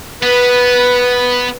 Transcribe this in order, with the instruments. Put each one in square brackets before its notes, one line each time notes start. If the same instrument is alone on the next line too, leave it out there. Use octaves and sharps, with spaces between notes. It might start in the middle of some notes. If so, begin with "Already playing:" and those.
[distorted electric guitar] B3 [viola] B4